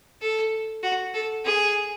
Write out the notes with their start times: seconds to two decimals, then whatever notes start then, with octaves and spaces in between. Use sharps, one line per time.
0.21 A4
0.83 F#4
1.14 A4
1.45 G#4